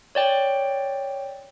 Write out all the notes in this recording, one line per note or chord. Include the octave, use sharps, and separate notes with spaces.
C#5 D5 G5